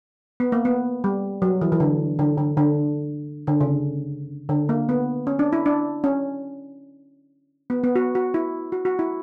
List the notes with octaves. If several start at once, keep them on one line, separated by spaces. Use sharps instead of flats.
B3
A#3
B3
G3
F#3
E3
E3
D3
D3
D3
D3
D3
C#3
D3
A#3
B3
C#4
D4
E4
D4
C#4
B3
B3
F#4
F#4
E4
F#4
F#4
E4